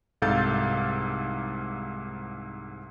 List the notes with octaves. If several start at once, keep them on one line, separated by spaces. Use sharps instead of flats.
C2 G#2 A4 F5 G6 A6